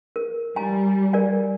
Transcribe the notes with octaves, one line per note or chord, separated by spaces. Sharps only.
A#4
G3 G#5 A#5
A#4 D5 G#5